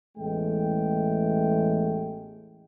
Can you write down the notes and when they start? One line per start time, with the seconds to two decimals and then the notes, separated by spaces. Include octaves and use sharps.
0.18 A1 E2 E3 G#3 A3 G5